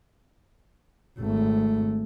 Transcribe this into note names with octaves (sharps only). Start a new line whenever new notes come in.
G#1 A3